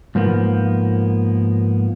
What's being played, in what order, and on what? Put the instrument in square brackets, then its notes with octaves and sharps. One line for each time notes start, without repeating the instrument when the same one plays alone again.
[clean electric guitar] G#2 F3 A#3 B3